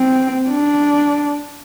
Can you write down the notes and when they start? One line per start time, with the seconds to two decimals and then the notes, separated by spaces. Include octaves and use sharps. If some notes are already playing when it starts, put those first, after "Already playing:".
Already playing: C4
0.49 D4